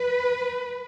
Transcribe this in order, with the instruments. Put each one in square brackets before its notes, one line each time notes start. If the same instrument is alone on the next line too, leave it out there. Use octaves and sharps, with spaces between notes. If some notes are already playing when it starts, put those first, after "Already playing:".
Already playing: [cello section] B4